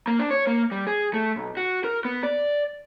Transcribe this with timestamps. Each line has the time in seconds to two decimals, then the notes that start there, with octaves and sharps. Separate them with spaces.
0.08 A#3
0.19 D4
0.31 C#5
0.47 A#3
0.72 G3
0.87 G#4
1.14 A3
1.36 B1
1.57 F#4
1.84 A#4
2.05 B3
2.23 D5